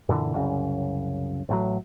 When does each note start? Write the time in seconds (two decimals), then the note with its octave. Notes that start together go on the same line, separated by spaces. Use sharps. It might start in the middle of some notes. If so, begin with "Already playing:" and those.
0.09 F#2 A#2 D3 E3
0.33 C2 F#2 C#3
1.49 A1 A2 F#3